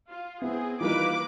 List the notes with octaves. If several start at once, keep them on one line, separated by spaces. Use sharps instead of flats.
F4
B3 C4 E4 G#4
D#3 E3 G3 A#3 D#4 F4 B4 D6